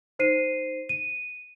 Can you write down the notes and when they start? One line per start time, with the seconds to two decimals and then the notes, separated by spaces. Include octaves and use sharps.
0.19 D#4 C5 C7 D#7
0.89 D#7